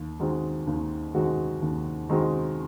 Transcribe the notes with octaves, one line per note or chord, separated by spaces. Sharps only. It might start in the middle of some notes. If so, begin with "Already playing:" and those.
Already playing: D#2
D#3 G#3 C4 F#4
D#2
D#3 G#3 C4 F#4
D#2
D#3 G#3 C4 F#4